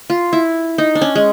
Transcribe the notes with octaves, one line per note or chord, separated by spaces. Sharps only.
F4
E4
D#4
D4
C#4
G#3